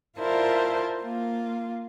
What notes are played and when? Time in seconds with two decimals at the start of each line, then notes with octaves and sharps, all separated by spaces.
0.19 E4 F4 A#4 C5 D5 A5
1.02 A#3 F4